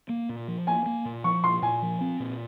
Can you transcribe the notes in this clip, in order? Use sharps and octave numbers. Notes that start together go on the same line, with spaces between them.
A#3
A#2
F3
A#3 G#5
A#3
A#2
F3 C#6
A#2 C6
A#2 G#5
F3
C4
A#2